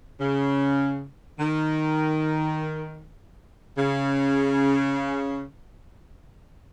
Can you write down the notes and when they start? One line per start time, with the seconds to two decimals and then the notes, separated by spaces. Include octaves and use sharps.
0.20 C#3
1.39 D#3
3.78 C#3